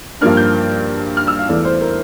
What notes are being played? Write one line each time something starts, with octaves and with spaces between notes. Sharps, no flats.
G2 F3 A#3 D4 F6
G6
F6
E6
F5
E2 E3 A3 D5
C5
A#4